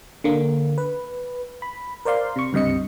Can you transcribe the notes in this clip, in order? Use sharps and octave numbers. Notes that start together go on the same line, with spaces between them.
D3 A#3
B4
B5
A#4 C5 D5 F5 C6
C3 C#6
C#2 G2 C3 D#5 C#7